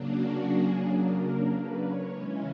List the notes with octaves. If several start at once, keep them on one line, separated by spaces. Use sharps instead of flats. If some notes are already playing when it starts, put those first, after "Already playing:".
Already playing: C#3 F#3 A#3 D4
F#4
G#4
A#4
B4
C#5
C#3 E3 G#3 C#4